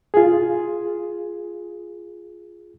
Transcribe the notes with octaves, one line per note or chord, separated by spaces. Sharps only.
F4 G#4